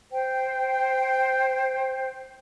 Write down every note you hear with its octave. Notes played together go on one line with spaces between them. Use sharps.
C5 G5